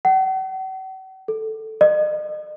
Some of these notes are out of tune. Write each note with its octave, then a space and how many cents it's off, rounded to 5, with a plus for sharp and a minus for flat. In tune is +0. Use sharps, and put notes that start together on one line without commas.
F#5 +45
A4 +0
D#5 -40